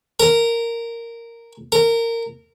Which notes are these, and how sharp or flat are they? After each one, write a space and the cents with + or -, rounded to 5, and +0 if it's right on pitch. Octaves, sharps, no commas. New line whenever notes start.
A#4 -10
A#4 -20